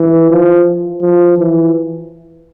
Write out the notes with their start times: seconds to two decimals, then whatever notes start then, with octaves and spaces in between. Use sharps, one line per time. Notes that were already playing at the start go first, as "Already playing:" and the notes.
Already playing: E3
0.30 F3
1.02 F3
1.38 E3